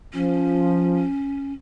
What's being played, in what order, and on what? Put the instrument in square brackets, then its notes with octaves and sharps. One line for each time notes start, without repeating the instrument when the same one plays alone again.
[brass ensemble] F3 [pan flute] C#4